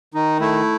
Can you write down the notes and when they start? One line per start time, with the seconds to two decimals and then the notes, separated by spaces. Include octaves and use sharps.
0.14 D#3 D#4
0.40 A3 E4